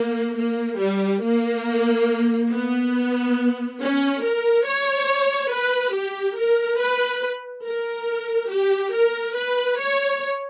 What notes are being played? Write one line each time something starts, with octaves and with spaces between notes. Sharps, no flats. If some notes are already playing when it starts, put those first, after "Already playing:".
Already playing: A#3
A#3
G3
A#3
B3
C#4
A#4
C#5
B4
G4
A#4
B4
A#4
G4
A#4
B4
C#5